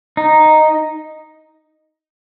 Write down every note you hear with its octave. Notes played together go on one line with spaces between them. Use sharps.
D#4